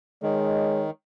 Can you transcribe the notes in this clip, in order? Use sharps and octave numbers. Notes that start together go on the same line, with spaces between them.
D#3 G#3 C#5